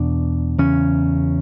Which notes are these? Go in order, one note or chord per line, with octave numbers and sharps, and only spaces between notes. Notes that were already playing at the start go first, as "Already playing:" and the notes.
Already playing: E2 B2 D4
E2 C#3 C#4